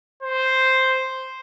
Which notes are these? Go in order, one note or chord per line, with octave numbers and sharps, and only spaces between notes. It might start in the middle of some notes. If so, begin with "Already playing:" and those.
C5